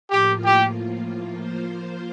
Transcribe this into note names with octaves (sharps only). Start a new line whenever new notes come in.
A2 F3 A#3 F4 G4
G4
F3 A#3 F4 C5